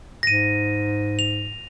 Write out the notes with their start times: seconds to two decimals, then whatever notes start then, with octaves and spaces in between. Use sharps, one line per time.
0.23 G#2 A#6 D#7
1.19 F7